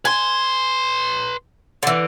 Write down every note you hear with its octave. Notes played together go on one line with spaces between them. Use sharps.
B4 G#5 C6
D3 E3